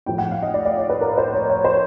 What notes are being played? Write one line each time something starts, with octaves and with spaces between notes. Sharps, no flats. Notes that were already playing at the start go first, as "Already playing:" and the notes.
A2 F3 A3 G5
F#5
F5
D#5
D5
D5
C#5
B4
A#4
C5
C#5
C#5
C5